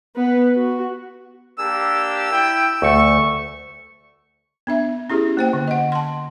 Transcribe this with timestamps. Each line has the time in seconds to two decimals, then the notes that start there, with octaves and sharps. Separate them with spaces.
0.16 B3 B4
0.56 F#4
1.58 A#3 D4 G4 E6
2.31 E4 G5
2.82 D2 A3 C#6
4.67 B3 D4 E5
5.10 C#4 E4 G4 G#4
5.37 A#3 C5 G5
5.53 D3
5.68 D#5 F#5
5.92 A5 C6